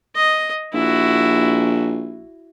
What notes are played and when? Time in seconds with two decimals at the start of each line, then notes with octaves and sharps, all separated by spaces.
0.15 D#5
0.74 A#1 E4 F#4